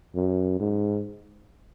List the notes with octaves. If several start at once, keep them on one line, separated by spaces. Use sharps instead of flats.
F#2
G#2